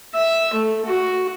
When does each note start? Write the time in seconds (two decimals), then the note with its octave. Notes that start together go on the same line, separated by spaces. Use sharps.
0.15 E5
0.53 A3
0.86 F#4